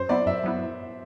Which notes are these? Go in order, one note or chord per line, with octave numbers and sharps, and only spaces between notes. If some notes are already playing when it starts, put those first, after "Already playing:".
Already playing: F#2 C5
F#3 B3 E4 D5
F#2 E5
F#3 B3 E4